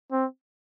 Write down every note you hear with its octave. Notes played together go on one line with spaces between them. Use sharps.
C4